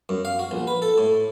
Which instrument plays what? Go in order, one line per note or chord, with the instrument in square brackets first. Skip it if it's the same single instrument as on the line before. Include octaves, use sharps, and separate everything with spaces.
[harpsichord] F#2
F5
F#4
A#1
B4
A4
A2